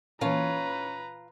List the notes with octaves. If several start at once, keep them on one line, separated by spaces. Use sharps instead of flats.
A#2 E3 C#4 F4 B4 C#5 A5 A#5